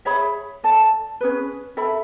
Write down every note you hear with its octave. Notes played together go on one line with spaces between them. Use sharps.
G#4 C#5 E5 B5
A4 D5 A5
C#4 G#4 B4
A4 E5 B5